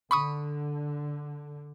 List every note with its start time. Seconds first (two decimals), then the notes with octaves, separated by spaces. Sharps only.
0.11 D3 B5 C#6 D#6